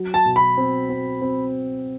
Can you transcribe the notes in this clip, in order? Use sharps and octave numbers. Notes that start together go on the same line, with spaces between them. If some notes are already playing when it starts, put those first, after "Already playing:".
Already playing: F#3
A5
B2
B5
C4
C4
C4